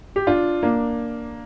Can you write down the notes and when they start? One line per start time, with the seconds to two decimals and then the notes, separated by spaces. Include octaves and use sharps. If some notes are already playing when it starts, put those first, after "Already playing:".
0.16 G4
0.27 D4 F4
0.63 A#3 D4